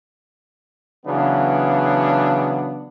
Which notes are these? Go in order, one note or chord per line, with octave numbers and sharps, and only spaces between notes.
C#3 E3 F#3 B3 D4